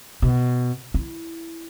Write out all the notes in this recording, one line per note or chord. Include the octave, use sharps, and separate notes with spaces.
B2
E4